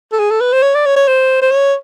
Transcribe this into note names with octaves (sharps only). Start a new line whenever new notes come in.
A4
G#4
A4
B4
C5
C#5
D5
C#5
C#5
C5
C5
C#5